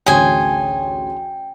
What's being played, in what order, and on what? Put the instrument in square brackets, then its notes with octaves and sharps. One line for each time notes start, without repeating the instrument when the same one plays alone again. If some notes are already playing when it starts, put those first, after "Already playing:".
[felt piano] A1 D2 C#5 [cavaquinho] G#4 C5 G#5 [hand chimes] G5